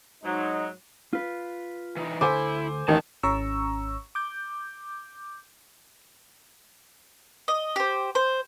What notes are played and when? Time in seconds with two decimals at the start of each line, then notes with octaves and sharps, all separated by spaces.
0.24 G#2 F#3 D#4
1.13 F4 B4
1.96 E3 D#4
2.21 D2 E4 A4 C5 F#5 G#5 D6
2.88 A1 D#3 A5
3.23 G#1 C#4 A#5 C#6 E6
4.15 D6 G6
7.48 D#5
7.76 G4 C5
8.15 C5